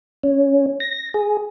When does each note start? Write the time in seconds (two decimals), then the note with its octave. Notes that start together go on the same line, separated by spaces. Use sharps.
0.23 C#4
0.80 A#6
1.14 G#4